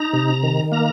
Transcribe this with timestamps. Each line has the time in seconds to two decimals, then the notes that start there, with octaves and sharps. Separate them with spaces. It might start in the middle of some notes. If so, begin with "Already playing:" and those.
Already playing: D#4 A#5
0.13 C3
0.43 D#3
0.72 A#3 A#5